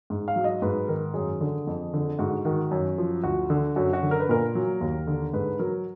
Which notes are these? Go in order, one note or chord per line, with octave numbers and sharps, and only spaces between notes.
G#2
F5
F#3
D#5
G#2 B4
D#3 A#4
F#2 G#4
D3
F2
D3
G#2 F#4
D#3 F#4
F#2
F3
D2 F#4
D3
F#2 F#4
F#4
D3
A#4
B4
A#2 A#4
F#3
D#2
D3
G#2 B4
F#3 A#4